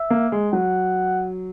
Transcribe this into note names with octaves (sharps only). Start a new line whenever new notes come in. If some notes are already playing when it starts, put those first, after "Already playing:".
Already playing: E5
A#3
G#3
F#3 F#5